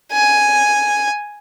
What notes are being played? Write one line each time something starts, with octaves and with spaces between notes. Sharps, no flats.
G#5